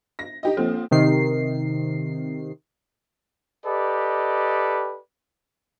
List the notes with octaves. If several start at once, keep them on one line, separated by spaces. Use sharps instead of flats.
A#6
D#4 G4 D#5
F3 A#3 C4 A4
C3 D#3 C7
G4 A4 B4 D5 D#5